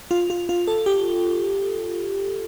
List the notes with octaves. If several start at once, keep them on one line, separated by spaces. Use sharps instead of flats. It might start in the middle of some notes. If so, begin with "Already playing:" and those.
F4
F4
F4
A4
G4